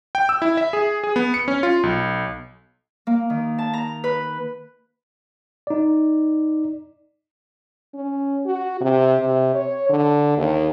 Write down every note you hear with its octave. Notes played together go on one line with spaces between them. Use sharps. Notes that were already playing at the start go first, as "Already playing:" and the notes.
G5
E6
E4
E5
G#4
G#4
B3
C#7
C#4
F4
B1
A#3
D#3
A5
A#5
B4
D#4 D5
C#4
F#4
C3
C3
C#5
D3
D#2